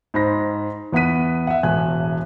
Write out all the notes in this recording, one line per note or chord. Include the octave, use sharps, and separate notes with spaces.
G#2 C5 B5 A#6
E2 B3 F#5 B5 B6 D#7
E5 F#5
E1 E2 A2 E5 G#5 F#6